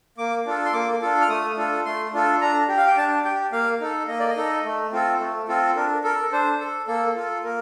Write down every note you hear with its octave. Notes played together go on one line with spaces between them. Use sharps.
A#3 D6
D4 F4 A4
C6
A#3 D6
D4 F4 A4
F6
A3 D#6
D4 F4 A4
A3 C6
D4 F4 A4
D4 A#5
G4
F5
G5
D4 A5
G4 G5
A#3 F5
D#4 A4
A#3 D#5
D5
D#5
D#4 A4
A3
C4 F4 A4
A3
C4 F4 A4
D4 A#4
A4 A#4
D4 C5
A4
A#3 A4
F4 A4
A#3 A#4